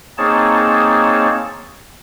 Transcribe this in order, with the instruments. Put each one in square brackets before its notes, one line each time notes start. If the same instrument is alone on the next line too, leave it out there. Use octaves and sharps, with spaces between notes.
[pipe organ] A#3 C4 D#4 G#4 C#5 A5